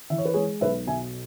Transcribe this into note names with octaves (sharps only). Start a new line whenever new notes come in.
E3 E5
C#5
B4
G#3 G#4 C#5
B1 B4 E5
B2 E5 G#5